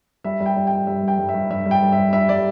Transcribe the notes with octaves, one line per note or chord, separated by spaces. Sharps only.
G3 E5
G3
G5
G3
G3 G5
G2 E5
G2
G5
G2
E5
G2
G2 E5
G3
G5
G2
E5
G3
G3 E5
G3 D5